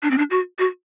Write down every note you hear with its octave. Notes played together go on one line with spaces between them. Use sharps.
D4
C4
D4
F#4
F#4